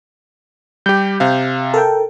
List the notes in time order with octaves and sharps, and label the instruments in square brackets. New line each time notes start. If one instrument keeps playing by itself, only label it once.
[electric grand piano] G3 G4 [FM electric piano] G6
[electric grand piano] C3 F5
[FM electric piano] A4 A#4 G5